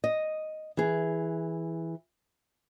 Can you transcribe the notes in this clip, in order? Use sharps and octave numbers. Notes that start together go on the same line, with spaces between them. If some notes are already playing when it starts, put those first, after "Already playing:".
D#5
E3 G#4